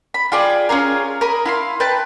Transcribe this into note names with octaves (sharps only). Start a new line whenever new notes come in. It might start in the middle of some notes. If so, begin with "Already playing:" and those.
B5
F4 G#4 D5 G5
C#4 F4 G#4 A#4
A#4 B5 D#6
E4 F5 C6
B4 G5 A5